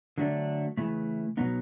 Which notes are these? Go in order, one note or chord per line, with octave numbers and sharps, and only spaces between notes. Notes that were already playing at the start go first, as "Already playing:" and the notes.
D3 F#3 A3 D4
C#3 E3 A3
B2 F#3 B3 D#4